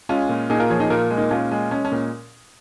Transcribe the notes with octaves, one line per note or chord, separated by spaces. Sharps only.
G#3 C#4 F4
A#2
A#2 D#4 G#4
F4 A#4
F3 G#4 C#5
D#4 G#4
A#2 F4 A#4
G#3
A#3 D#4
A#2 C#4 F4
G#3
G#3 C#4
C#4
A#2